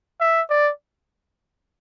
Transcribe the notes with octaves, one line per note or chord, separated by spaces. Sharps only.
E5
D5